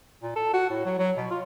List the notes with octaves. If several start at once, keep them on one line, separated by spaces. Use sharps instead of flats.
A#2
A4
F#4
A2
F#3
F#3
B2
F4